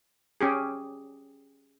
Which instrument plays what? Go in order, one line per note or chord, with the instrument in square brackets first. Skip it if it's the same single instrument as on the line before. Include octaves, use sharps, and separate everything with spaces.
[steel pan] C#4 G4 G#4